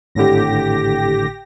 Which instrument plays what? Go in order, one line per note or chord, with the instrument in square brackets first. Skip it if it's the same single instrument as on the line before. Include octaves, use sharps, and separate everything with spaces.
[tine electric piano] G#1 A2 D3 [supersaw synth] G4 A#6